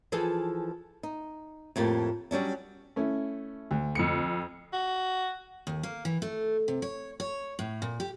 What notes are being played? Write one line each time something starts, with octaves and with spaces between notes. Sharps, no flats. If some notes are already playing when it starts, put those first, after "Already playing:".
E3 F3 G#4 A4
D#4
F2 A2 A#3 G4
F#3 G3 C#4 D4
A3 C#4 E4
D2
F2 C#7
F#4
D#2
A#3
E3
A3
C3
C#5
C#5
A2
A#2
G4